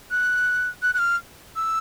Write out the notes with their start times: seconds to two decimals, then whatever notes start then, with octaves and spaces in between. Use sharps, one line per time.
0.11 F#6
0.82 F#6
0.94 F#6
0.99 F6
1.56 E6